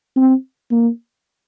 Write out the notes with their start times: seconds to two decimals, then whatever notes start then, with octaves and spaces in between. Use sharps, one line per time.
0.17 C4
0.71 A#3